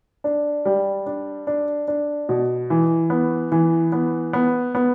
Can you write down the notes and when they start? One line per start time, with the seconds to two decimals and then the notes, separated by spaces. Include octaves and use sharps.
0.24 D4
0.65 G3
1.06 D4
1.47 D4
1.88 D4
2.29 B2
2.70 E3
3.10 B3
3.52 E3
3.92 B3
4.33 B3
4.75 B3